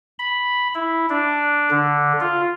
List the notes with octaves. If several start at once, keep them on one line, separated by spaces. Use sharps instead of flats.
B5
E4
D4
D3
F4